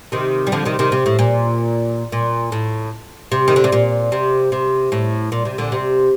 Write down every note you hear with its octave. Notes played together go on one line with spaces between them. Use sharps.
C3 D#3
G3
D3 F3
C3 D#3
C3 D#3
C3
A2
A#2
A#2
A2
C3
D#3
D3
C3
A#2
C3
C3
A2
A#2
C3
A#2 D3
C3